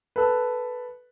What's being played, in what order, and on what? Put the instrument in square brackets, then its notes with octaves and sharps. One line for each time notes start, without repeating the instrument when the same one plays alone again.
[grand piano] A4 B4